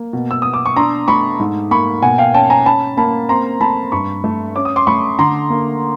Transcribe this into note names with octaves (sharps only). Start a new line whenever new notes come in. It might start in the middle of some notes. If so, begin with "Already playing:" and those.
Already playing: A#3
B2
E6
B3 D#6
D6
C#6
D4 A#5 C6
A3 B5 C#6
G#2
A#3 B5 C#6
B2 F#5 G#5
F5 G5
C#4 G5 A5
G#5 A#5
C#4 A5 B5
A#3 A5 B5
C4 A#5 C6
A3 A5 B5
G2 B5 C#6
A3
C#4 D6
D#6
C6 D6
A3 B5 C#6
D3 A#5 C6
A#3